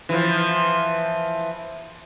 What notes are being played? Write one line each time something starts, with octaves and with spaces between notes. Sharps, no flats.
E3 F3